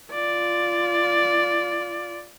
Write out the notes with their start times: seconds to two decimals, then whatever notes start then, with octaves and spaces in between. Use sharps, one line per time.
0.13 F4 D5